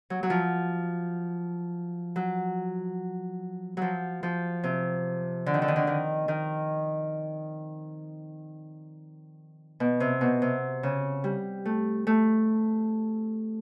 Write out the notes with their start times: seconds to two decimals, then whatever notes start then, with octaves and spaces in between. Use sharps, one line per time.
0.10 F#3
0.23 F#3
0.30 F3
2.16 F#3
3.77 F3 F#3
4.23 F3
4.64 C3
5.46 D3
5.54 D#3
5.62 D3
5.68 D#3
5.76 D3
5.87 D#3
6.28 D#3
9.80 B2
10.00 C3
10.21 B2
10.42 C3
10.83 C#3
11.24 G3
11.65 A3
12.07 A3